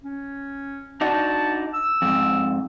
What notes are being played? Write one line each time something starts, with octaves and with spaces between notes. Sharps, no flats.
C#4
D4 D#4 F#4 A5
E6
F2 G#2